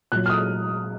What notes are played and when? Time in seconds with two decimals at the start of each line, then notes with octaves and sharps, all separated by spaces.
0.12 A#2 F#3 F#6
0.26 F6
0.30 D#6